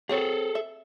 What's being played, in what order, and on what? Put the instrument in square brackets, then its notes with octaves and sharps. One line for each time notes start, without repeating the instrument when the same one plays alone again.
[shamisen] F#3 C4 C#5 [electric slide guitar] G#4 A4
[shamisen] E5